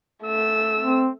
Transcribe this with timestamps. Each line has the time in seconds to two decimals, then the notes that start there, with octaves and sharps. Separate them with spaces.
0.24 A3 E6
0.80 C4